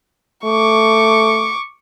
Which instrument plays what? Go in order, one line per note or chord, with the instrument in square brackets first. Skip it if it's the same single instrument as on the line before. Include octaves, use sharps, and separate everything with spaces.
[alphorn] A3 [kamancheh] C#6 D6